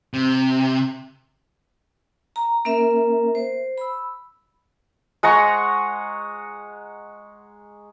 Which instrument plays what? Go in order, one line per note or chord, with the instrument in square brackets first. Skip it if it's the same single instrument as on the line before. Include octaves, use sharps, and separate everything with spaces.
[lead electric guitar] C3
[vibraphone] A#5
A#3 C#4 A#4 E5
C5
B5 E6
[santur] G#3 F#5 A#5 C#6